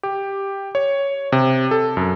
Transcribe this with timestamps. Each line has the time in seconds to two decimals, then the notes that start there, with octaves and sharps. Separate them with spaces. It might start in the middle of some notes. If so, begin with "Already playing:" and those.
0.03 G4
0.75 C#5
1.32 C3
1.71 A4
1.97 F#2